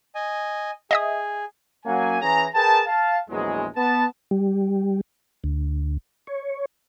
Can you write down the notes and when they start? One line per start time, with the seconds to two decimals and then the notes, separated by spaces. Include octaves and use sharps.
0.15 D#5 G#5
0.91 G#4 D#5 E5 D#6
1.85 F#3 A#3 C#4 F#5 G#5
2.21 E3 C#4 G#4 G#5 A#5
2.55 G#4 A#4 B4 G5 A5
2.86 F5 A5
3.30 A#1 E2 E3 F#3 G#3
3.76 B3 A5
4.31 G3
5.44 D2
6.27 C#5